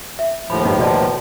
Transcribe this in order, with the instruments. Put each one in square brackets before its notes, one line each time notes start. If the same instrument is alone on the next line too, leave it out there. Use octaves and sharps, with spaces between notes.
[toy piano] E5
[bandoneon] D#2 A2 F3 [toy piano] B5
[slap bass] G2 [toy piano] D#5 B5
[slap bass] B2 [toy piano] F#4 D5 A5